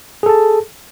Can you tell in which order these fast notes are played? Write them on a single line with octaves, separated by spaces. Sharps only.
G#4 A4 A5